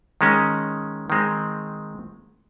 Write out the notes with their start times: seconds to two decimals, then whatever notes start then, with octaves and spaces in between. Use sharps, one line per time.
0.21 D#3 G#3 C#4
1.10 D#3 G#3 C4